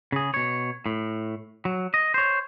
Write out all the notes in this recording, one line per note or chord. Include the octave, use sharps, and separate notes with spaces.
C#3 G#4
B2 C#5
A2
F#3
D#5
C5 C#5